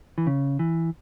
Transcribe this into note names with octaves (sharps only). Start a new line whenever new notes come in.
E3
C#3
E3